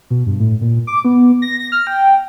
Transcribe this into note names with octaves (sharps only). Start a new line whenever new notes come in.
B2
G2
A2
A#2
D6
B3
A#6
A#6
F6
G5